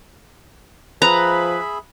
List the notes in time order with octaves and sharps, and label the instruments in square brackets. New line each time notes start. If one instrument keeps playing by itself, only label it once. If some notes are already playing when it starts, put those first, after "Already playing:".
[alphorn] F3 [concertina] G#4 E5 B5 [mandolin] B4 [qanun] A#5